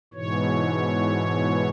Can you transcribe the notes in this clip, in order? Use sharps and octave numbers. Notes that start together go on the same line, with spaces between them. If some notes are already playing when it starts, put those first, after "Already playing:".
G#2 B2 E3 C#5